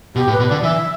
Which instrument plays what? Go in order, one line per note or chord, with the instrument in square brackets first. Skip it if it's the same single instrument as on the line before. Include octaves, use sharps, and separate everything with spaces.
[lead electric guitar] B2 [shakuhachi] G4
[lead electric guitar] A2
[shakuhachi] B4
[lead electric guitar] B2
[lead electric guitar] D3 [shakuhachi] D5
[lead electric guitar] E3 [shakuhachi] E5